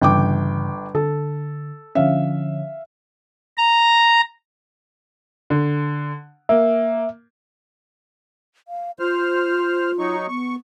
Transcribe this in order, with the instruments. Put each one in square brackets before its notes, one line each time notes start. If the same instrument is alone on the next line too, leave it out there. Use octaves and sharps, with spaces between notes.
[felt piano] G1 G5 D6 [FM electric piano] G2 C#3 E3
[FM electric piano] D3 [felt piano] A4
[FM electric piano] D3 F3 C#4 [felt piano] E5 F5
[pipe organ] A#5
[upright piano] D3
[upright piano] A#3 [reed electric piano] E5
[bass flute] F5
[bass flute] F4 [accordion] C5 F6
[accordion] F#3 D#4 C#6
[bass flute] B3 [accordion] C#6